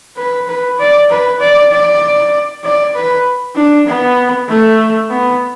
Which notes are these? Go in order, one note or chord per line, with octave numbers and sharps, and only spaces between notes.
B4
B4
D5
B4
D5
D5
D5
B4
D4
B3
A3
B3